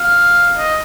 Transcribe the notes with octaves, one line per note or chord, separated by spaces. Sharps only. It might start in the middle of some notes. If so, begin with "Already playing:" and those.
Already playing: F5
D#5